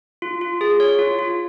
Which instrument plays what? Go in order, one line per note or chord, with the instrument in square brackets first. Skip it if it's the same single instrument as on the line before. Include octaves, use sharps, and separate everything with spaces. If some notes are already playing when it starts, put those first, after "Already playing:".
[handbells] F4
F4
G#4
C#5
F4
F4